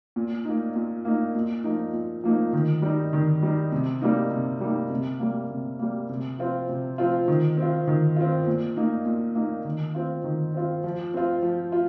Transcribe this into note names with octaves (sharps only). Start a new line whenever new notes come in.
A#2
A#3 D#4
A#2
A#3 D#4
A#2
F3 A#3 D#4
A#2
F3 A#3 D#4
D#3
G3 D#4
D#3
G3 D#4
C3
G3 A#3 D#4
C3
G3 A#3 D#4
C3
G3 A#3
C3
G3 A#3
C3
F3 C4 F4
C3
F3 C4 F4
D#3
C4 F4
D#3
C4 F4
A#2
A#3 D#4
A#2
A#3 D#4
D#3
C4 F4
D#3
C4 F4
F3
C4 F4
F3
F4